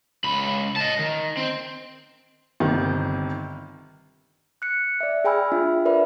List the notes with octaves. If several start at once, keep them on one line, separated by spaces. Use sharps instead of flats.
C#2 B5
D#5 A5
D#3
C4
G1 C3 D#3
F#6 C#7
D5 E5
G#4 G5 G#5 B5 E6 F6
D4 F4 E5
A#4 B4 D5 E5 B5